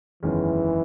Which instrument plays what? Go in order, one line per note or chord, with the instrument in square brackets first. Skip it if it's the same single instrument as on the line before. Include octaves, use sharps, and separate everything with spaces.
[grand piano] F#1 E2 D#3 G#3 C#4 [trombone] E3